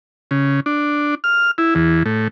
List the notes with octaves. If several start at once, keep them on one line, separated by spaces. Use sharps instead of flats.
C#3
D4
F6
E4
E2
A2